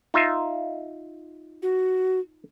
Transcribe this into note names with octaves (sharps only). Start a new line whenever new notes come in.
D#4 F4 E5
F#4